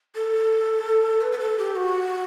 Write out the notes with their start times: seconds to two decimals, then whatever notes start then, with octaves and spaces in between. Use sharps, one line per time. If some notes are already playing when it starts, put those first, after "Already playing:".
0.15 A4
1.21 B4
1.32 B4
1.39 A4
1.58 G4
1.76 F#4